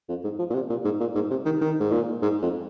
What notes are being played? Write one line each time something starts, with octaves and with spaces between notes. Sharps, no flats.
F2
G#2
F3
A#2
C3
A#2
G#2
A#2
G#2
C3
D#3
D#3
G#2
A#2
G#2
F2